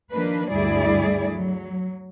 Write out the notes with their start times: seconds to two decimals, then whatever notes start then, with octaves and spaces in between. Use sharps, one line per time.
0.11 D#3 F3 A#3 D4 B4
0.50 D2 G2 G3 E4 G#4 D5
1.32 F#3